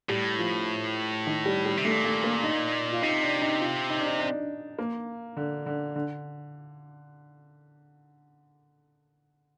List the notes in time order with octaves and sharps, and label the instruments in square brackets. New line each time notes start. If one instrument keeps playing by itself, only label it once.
[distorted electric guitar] A2 [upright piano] G3
[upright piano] F3
D#3
G3
G3
[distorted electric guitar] C3
[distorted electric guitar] A#2 [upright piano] A3
[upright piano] A3
A#3
D#4
F4
[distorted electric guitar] C3 [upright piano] D#4
[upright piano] D4
D#4
F4
D#4
D4
D#4
D4
A#3
D3
D3
D3